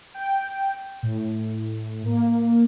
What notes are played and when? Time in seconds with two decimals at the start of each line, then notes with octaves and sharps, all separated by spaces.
0.14 G5
1.03 A2
2.06 A#3